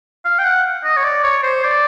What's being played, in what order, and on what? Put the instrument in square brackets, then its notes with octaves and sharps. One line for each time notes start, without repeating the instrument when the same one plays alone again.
[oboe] F5
G5
F#5
D#5
C#5
D5
C#5
C5
D5